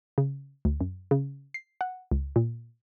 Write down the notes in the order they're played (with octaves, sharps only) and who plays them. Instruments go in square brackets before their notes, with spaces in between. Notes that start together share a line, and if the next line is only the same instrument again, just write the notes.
[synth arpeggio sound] C#3
D2
F#2
C#3
C7
F#5
C#2
A#2